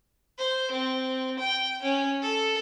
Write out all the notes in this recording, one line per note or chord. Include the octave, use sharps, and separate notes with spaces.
C5
C4
G5
C#4
A4